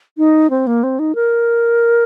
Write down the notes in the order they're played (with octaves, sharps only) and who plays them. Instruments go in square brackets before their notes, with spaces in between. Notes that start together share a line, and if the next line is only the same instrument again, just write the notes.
[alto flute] D#4
C4
A#3
C4
D#4
A#4